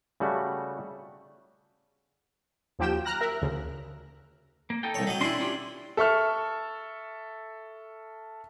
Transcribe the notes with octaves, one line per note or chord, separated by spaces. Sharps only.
C#3 G3 A3 F#4
D#2 F3 F#3 G4 G5 E7
A#5 F6 F#6 A#6
A#4 E5
D2 C#3
A#3
D#4 A4 G5
C2 C#5
F#3 D#5
C#4 D4 E4 C6
C#4 F4 G4
A4 E5 C#6 F6